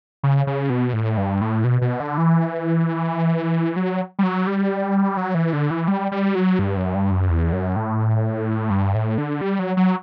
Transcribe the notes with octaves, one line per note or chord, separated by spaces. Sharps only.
C#3
C#3
B2
A2
G2
A2
B2
B2
D3
E3
F#3
G3
F#3
G3
F#3
E3
D3
E3
G3
G3
F#3
G2
F#2
G2
F#2
E2
F#2
A2
G2
A2
D3
G3
F#3
F#3